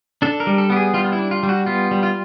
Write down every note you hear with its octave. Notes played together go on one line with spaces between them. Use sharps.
D4 A4
A#4
G3
A4
B3 G4
G#4
G3 F4
F4
E4
D4
F4
G3
F#4
B3 F4
G3
F4